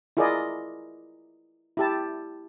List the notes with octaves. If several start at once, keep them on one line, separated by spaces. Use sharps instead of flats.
E4 F4 G#4 A#4 D5 D#5
E4 G4 A5